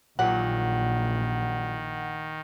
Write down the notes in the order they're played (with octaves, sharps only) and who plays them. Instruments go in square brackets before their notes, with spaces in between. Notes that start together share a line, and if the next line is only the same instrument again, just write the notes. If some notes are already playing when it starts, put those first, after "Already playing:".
[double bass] A#1 [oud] A#2 F#3 G4 [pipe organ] D#3 [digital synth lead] F#5